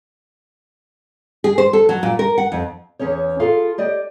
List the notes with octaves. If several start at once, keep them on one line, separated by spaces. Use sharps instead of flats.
G#4
C5
A4
F#3
A#2
A#4
F#5
F2
E2 C#4 G#4 C#5
F4 G#4 A4 F5
G4 D5 D#5